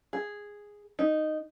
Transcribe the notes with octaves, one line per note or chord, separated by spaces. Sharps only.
G#4
D#4